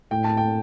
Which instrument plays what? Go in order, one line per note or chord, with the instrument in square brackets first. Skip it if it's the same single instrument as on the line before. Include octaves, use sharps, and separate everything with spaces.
[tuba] A2 [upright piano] G5
[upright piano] A5
G5